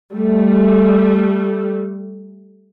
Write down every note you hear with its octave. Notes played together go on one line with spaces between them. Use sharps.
G3 A3